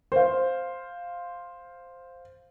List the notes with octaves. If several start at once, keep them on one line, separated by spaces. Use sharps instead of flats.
C5 F5